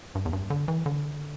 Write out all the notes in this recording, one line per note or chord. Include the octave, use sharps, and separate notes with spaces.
G2
E2
G2
D3
E3
D3